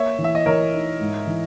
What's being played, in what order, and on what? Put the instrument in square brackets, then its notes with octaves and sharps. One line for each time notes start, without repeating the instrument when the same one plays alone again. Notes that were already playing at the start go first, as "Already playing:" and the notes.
Already playing: [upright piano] A#3 [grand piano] C#5 E5
[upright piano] E3
[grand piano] E5
D#5
[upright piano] E3 [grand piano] A#4 C#5
[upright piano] D#4
G#2
E3